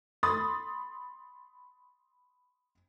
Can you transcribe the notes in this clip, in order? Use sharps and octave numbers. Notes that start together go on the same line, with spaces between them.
B5 C6 D#6 A6